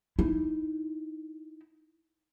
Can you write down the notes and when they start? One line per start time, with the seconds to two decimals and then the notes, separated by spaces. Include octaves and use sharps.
0.19 D#4 E4